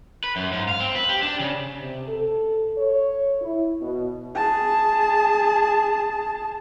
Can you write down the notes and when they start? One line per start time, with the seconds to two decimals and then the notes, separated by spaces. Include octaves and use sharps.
0.24 B4
0.36 F#2
0.52 G#2
0.68 F5
0.80 C4
0.96 B4
1.09 G4
1.23 D4
1.40 C#3
1.80 C3
2.08 A4
2.78 C#5
3.41 E4
3.81 B2
4.35 G#4 A5